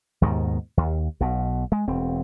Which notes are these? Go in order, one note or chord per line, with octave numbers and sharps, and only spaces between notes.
D#2 G#2 B2 D#3
D#2
B1 B2
G#3
E1 C4